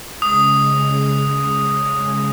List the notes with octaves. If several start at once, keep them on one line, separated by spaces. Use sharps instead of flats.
C#3 G#3 D#6